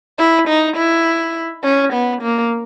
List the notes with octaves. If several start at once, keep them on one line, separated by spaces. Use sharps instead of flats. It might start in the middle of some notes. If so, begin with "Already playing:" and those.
E4
D#4
E4
C#4
B3
A#3